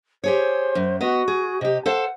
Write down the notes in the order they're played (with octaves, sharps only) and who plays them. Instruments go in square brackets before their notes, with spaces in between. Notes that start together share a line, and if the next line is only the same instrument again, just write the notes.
[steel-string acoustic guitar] G4 G#4 C#5 [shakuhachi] C5
[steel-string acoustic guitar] F#2
[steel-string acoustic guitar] B3 D#5 [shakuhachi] F#4
[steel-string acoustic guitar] G#4
[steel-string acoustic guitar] C3 G4 [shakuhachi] D#5
[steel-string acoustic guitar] A4 C5 F5 [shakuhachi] F#5